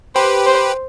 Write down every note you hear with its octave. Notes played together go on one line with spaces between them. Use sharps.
G4 B4 C5
C5